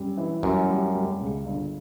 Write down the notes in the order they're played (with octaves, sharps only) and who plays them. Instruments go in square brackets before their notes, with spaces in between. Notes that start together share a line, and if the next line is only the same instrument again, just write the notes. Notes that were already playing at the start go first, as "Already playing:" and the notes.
Already playing: [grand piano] F#2 G3
E3
[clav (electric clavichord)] F#2 [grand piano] G3
[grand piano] G3
G3
C#2
G1